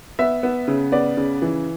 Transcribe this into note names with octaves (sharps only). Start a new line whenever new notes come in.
B3 E5
B3
C#3
B3 D5
C#3
E3